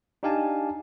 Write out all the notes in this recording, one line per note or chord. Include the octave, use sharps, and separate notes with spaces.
D4 D#4 G4 F5 G#5 A5